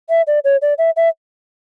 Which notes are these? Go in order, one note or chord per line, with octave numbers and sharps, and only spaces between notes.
E5
D5
C#5
D5
E5
E5